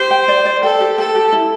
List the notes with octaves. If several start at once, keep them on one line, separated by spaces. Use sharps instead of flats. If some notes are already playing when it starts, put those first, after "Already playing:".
Already playing: G4 C5
G5
D5
D5
A4 G5
G4
A4 G5
G4
E4